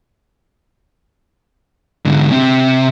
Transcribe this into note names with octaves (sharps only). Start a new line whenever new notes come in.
G#2 D3
C3